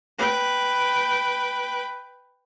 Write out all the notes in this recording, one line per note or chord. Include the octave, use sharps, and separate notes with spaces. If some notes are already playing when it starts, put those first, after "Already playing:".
B4 G5